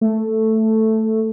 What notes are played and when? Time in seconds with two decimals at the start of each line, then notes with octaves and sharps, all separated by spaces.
0.01 A3